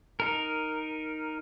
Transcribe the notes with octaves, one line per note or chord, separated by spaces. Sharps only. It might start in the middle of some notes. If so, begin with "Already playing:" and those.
D#4 A#4